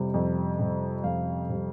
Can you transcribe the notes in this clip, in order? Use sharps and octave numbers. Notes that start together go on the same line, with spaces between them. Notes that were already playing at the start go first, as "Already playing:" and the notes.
Already playing: F2 C3 G3
F2
C3 G3
F2 F5
C3 G3